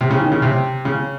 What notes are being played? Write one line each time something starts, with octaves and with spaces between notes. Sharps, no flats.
C3
C#3
D#3
C#3
C3
C#3